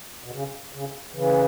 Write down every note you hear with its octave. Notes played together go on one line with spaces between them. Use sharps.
B2
C#3
C#3
C#3 E3